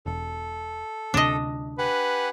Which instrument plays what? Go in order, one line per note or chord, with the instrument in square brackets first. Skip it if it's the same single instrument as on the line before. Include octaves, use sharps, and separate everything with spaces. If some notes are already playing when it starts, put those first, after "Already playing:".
[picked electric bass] E1 [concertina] A4
[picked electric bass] D2 C3 [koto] D4 D#5
[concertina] G4 F#5 G#5 [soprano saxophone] B4